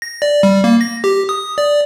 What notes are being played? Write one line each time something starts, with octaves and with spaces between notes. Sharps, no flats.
A#6
D5
G3
A#3
A#6
G4
D#6
D5